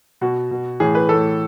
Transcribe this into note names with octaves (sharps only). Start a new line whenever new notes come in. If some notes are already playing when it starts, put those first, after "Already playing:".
B2 F#4
B2
A2 E3 G#4
B4
A2 E3 A4